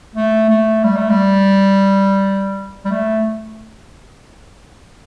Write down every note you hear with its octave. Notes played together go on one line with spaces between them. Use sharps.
A3
A3
G3
A3
G3
G3
A3